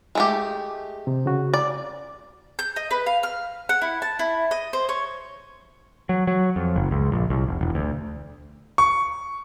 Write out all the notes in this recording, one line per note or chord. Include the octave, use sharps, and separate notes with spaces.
G#3 A3 G4
C3
C#3 F#4
D5
G6
D#5
B4
F5
F6
F#5
E4
A5
E4
D#5
C5
C#5
F#3
F#3
F2
F#1
C#2
A#1
C2
F1
E1
D2
C#6